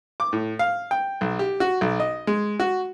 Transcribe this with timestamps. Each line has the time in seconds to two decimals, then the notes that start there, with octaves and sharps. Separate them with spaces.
0.20 D6
0.33 A2
0.59 F5
0.91 G5
1.21 B1
1.39 G4
1.60 F#4
1.81 B1
2.00 D#5
2.27 G#3
2.60 F#4